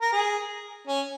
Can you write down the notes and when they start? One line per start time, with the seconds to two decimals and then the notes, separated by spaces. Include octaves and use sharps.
0.01 A#4
0.12 G#4
0.87 C#4